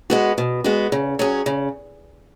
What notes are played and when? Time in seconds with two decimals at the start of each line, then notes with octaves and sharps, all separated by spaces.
0.10 G#3 B3 F#4
0.38 B2
0.64 G#3 B3 F#4
0.92 C#3
1.19 F#3 C#4 G#4
1.46 C#3